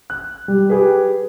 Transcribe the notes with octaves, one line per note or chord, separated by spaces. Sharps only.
F#6
G3
G4 G#4 B4